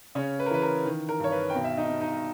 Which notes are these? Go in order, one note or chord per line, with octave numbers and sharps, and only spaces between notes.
C#3 C#4 C#5
B4
A#4
E3 B4
A#4
D#3
A#4
G2 C#5
B4
G5
B2
E5
D#4 D#5
B2
D#4 D#5